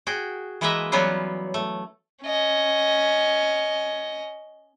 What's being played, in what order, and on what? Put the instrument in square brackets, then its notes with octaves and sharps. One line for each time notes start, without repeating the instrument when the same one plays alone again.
[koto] F#4 G#4 G5
E3 G#3 A#3 B4 D#5 E5
E3 F#3 G3 B3 C#4 F4
A3
[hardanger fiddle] C#4 D#5